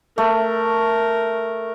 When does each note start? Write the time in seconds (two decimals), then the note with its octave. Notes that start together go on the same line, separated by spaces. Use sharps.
0.18 A3 A#4